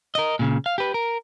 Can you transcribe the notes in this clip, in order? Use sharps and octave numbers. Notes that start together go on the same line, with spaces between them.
A#4 D#5
A#2 C#3
F5
G4 B4
A#4